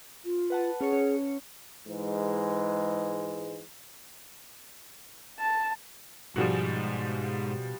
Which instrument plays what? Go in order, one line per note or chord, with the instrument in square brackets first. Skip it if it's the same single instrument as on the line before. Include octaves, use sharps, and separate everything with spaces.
[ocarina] F4
[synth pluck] B4 F#5 A5
[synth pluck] C#4 C#5 C#7 [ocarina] G#4
[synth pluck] C#4 C#5
[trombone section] G#2 E3 G#3
[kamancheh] A5
[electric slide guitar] G#2 G#3 [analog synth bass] B2 [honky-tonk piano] F3 G3 F#4